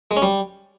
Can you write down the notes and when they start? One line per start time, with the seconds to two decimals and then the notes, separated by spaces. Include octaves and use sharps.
0.11 G#3
0.16 C#4
0.22 G3